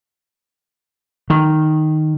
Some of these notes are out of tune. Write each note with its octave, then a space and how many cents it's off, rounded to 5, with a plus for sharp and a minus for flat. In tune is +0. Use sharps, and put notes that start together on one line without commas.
D#3 -5